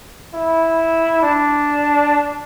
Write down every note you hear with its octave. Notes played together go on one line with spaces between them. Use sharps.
E4
D4